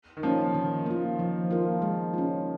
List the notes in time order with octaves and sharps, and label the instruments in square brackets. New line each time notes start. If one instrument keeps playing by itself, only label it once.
[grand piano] D#3
[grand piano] F3 [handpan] A#3 C#4
[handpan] D#3
A#3 F4
F3
A#3 F4 A#4
G#3
C#4 F4